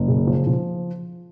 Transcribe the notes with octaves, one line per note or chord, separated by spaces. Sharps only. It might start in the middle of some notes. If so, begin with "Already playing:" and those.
Already playing: F#1
C#3
F3
F3